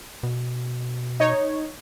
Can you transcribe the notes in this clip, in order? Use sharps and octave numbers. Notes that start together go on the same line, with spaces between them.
B2
D#4 C#5